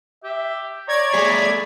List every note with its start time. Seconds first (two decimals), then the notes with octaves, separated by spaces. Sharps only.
0.23 G4 E5
0.88 C#5 D5 A#5 G#6
1.14 A3 G#4 B5